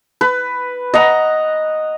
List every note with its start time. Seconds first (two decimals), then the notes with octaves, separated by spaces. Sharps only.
0.21 B4
0.94 D#5 F#5 A#5